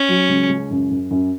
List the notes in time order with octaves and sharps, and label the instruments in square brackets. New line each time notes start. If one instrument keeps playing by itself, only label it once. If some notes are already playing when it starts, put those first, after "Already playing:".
Already playing: [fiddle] C#4
[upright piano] F#3
C#2
C#2
F#2
F#2
F#2